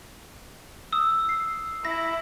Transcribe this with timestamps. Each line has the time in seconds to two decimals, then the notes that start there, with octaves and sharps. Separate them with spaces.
0.93 D#6 E6
1.29 C7
1.85 E4 A#6